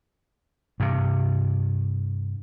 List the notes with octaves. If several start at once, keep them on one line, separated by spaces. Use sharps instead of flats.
G2 C3